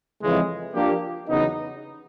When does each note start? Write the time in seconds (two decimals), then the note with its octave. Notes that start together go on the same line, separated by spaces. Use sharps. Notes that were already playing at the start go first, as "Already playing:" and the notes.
0.21 F2 C#3 E3 G#3
0.74 F3 A#3 D4 G4
1.27 E2 C#3 F#3 B3 D#4